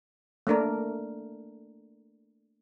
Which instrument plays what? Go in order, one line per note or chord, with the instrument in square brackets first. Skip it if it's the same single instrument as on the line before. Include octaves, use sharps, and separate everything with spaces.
[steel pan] A3 A#3 D4 A#4